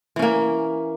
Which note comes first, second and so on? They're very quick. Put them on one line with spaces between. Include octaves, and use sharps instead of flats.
E3 C#4 A#3